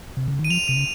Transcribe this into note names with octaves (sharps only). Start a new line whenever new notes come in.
C3
C#3
D#3
D#7
F3 F7
C3 D#7
C#3